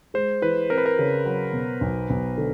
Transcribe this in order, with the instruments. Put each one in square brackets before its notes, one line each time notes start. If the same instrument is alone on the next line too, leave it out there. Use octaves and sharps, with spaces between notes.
[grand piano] G#3 [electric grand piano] C5
[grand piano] E3 [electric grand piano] B4
[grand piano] C4 [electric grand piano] A#4
[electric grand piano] B4
A#4
[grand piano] C#3
F#3
B2
B1
B1
D3